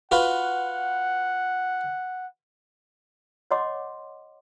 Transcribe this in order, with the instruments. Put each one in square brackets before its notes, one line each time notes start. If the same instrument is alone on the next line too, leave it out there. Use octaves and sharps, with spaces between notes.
[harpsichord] F4 F#4 B4 [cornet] F#5
[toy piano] C#5 D#5 F#5 C6 D6